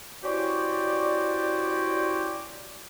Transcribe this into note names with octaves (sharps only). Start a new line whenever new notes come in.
C#4 E4 F#4 G4 C5 D5